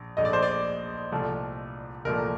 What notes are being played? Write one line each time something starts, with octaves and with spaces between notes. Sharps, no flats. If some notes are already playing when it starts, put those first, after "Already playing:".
Already playing: A#1
A#1 A#2 A3 D#5
D5
C5
D5
C2 A#2 F3 A3
C2 A#2 F3 A3 A#4